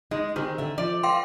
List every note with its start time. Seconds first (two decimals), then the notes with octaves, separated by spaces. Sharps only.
0.11 G#3 D#4
0.36 D#3 C4 G4 G#4
0.58 D3 E5
0.78 F3 D5
1.03 B4 F5 G5 C6